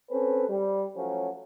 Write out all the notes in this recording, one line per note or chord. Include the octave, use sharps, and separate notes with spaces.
C4 C#4 A4 B4
G3
F3 F#3 A3 C#4